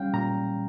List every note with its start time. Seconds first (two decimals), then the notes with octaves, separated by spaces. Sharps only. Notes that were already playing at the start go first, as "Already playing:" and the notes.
Already playing: G3 C#4 F5 G5
0.13 A#2 A#5